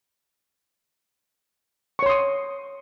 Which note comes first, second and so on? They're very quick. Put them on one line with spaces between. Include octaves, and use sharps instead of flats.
C#6 C#5 C6 D#6